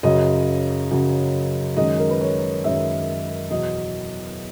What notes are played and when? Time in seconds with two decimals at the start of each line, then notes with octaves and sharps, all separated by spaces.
0.03 F#2 C#3 F#3 D#5
0.91 F#2 C#3 F#3
1.76 F#2 D#3 G#3 D#5
2.00 A#4
2.11 B4
2.21 C#5
2.64 F#2 D#3 G#3 E5
3.50 E2 B2 F#3 D#5